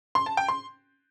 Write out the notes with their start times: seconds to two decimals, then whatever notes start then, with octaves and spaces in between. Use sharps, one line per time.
0.15 C6
0.26 A5
0.37 G5
0.48 C6